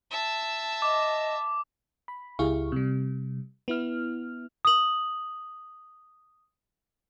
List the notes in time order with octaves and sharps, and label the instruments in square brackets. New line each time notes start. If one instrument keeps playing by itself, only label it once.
[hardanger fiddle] E5 A5
[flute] D#5 [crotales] D6
[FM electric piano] B5
C#2 E4 G4 G#4 F5 C#6
C3 G3
B3 E4 F6
[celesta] D#6 F#7